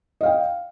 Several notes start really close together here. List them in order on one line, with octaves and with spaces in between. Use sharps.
D#5 F5 G5